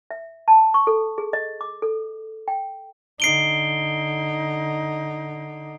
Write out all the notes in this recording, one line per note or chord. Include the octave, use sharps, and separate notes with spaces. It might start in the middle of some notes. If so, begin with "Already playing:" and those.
E5
A5
C#6
A4
G#4
D#5
D6
A4
G5
D3 D#4 C7 D7 G7